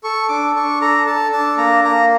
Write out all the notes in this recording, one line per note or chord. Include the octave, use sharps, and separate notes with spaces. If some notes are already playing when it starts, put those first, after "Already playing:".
A4 C#6
D4 D6
D4 C#6
A4 A#5
A4 A5
D4 A5
A#3 A#5
A#3 A#5